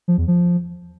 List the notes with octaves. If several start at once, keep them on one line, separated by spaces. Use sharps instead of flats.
F3
E2
F3